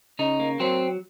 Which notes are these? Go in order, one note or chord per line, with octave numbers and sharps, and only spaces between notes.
C#3 D#4
A#3
F#3 C4